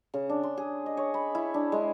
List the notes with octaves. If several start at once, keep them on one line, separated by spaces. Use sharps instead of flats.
C#3
D4
C6
G#4
D#5
C#5
B5
E4
D4
G#3